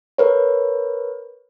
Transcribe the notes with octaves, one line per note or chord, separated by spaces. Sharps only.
A#4 B4 C#5